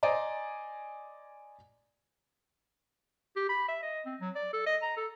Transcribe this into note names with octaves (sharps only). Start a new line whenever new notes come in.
C5 D5 D#5 G#5 A#5
G4
B5
E5
D#5
C4
F#3
D5
A4
D#5
A#5
A4